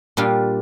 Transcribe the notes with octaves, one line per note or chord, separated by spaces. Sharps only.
A#2 G3 D4 F4